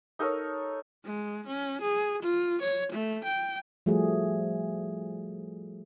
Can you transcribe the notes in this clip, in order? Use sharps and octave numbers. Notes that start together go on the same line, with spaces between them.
D#4 A4 A#4 C#5
G#3
C#4
G#4
F4
C#5
A3
G5
F3 G3 A3 F#4 G#4